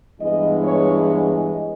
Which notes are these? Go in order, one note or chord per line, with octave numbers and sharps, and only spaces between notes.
G2 E3 G#3 B3 D#5
C#5
C#5
D#5